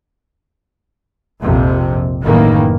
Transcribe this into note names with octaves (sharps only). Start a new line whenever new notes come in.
A#1 F2 C3
F#1 A2 D#3 E3 A#3